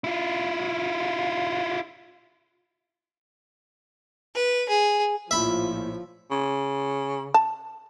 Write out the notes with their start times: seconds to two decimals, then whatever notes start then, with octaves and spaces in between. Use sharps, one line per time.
0.04 E4 F4
4.35 B4
4.69 G#4
5.31 A#1 A2 F3 E5 B5
6.31 C#3
7.34 A5